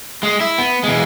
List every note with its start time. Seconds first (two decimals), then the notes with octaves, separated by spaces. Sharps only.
0.23 G#3
0.40 E4
0.58 B3
0.83 E2 G#3